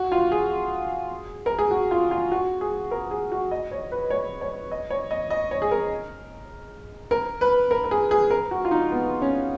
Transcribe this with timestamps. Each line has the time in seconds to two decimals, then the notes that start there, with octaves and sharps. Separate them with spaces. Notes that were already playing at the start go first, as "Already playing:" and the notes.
Already playing: F#4
0.12 F4
0.32 G#4
1.46 A#4
1.59 G#4
1.71 F#4
1.91 F4
2.11 F4
2.32 F#4
2.61 G#4
2.91 A#4
3.11 G#4
3.32 F#4
3.51 D#5
3.71 C#5
3.92 B4
4.10 C#5
4.41 C#5
4.71 D#5
4.90 C#5
5.11 D#5
5.30 D#5
5.51 C#5
5.62 G#4
5.71 A#4
7.11 A#4
7.41 B4
7.71 A#4
7.84 A#4
7.91 G#4
8.11 G#4
8.31 A#4
8.51 F#4
8.65 F4
8.71 D#4
8.92 B3
9.22 C#4